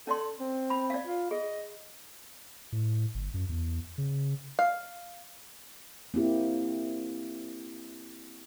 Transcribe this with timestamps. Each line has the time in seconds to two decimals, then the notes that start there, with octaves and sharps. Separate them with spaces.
0.07 C#4 A4 D5 C6
0.40 C4
0.70 B5
0.90 D5 F5
1.07 F4
1.31 G#4 D#5
2.72 A2
3.15 G1
3.34 F#2
3.49 E2
3.98 C#3
4.59 F5
6.14 A#3 C4 E4 G4